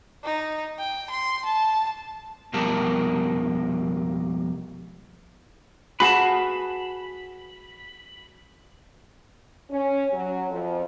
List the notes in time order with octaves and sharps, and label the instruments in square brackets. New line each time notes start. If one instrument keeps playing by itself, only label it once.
[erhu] D#4
G5
C6
A5
[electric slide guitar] F2 B2 G3 G4 A#4 A5
[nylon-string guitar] F#4 G#4 [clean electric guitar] B4 F5 A5 [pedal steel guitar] B5
[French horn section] C#4
F#3
F2